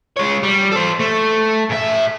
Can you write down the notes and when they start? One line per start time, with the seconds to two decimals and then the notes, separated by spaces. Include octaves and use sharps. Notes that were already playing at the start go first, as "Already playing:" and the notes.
0.17 G#3 C#5
0.43 G3
0.71 A4 C5
0.99 A3
1.69 G#2 E5